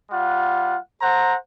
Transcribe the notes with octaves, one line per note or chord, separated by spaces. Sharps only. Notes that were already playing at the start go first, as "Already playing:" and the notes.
G3 F4 F#5
A4 C5 F#5 A#5